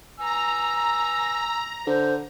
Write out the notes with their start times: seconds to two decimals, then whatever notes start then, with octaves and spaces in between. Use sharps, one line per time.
0.20 G#5 A#5 E6
1.87 D3 C5